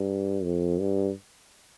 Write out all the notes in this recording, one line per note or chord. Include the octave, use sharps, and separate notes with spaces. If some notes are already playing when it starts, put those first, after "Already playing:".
Already playing: G2
F2
G2